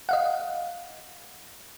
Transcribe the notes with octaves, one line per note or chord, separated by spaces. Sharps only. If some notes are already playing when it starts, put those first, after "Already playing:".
D#5 F5 F#5